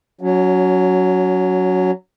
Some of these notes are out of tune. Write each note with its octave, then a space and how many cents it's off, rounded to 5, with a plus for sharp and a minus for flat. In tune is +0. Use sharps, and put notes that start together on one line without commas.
F#3 +0 C#4 +25